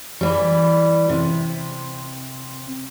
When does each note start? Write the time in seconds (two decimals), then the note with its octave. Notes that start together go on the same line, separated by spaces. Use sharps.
0.21 E3 G3
1.10 C3